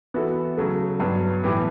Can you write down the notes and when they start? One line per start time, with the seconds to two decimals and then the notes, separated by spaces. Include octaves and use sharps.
0.14 E3 B3 F#4 A4
0.57 C#3 F#3 A3
1.00 G2 F#3 B3
1.43 A2 E3 B3 E4 G4